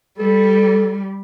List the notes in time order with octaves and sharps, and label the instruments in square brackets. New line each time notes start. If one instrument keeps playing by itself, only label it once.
[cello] G3 [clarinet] A4